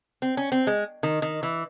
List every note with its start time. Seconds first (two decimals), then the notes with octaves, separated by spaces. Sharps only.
0.22 C4
0.37 C#4
0.52 C4
0.67 G#3
1.03 D#3
1.22 D#3
1.43 E3